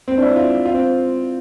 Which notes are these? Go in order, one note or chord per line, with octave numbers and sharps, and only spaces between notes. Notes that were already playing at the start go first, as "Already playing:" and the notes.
C4
D4
E4
F4
F4
C4